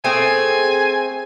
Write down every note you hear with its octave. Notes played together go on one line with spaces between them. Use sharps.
A3 C4 G#4 G#5